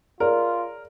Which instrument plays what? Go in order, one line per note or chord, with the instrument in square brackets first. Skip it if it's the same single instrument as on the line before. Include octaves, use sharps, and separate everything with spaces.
[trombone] F4 [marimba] G#4 C#5 D5 [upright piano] A#4